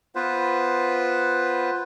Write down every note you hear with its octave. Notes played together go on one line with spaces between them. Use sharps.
B3 F4 B4 C5